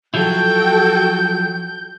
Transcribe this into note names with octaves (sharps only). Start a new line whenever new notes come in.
F3 F#3 E4 F#4 A4 G5 G6